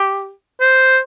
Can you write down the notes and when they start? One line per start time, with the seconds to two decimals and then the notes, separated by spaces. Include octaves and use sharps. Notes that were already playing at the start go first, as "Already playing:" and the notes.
Already playing: G4
0.61 C5